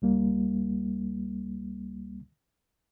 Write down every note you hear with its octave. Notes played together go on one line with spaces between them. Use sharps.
C#2 G3 A#3